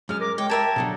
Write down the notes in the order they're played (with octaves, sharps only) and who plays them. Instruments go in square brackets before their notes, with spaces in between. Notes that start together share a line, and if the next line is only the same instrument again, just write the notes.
[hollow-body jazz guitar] F#2 G#3 [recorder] F6
[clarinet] A#4 [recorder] D6
[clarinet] G#3 [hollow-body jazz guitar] C#5 [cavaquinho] G5 [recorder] D6
[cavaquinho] G4 A#4 E5 [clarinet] A5 [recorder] G#6
[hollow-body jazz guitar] B2 D3 F#3